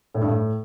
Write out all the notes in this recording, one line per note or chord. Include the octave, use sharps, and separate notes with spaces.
A2
G2
A2